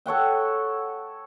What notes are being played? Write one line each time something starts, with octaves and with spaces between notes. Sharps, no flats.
A4 C#5 F#5 G5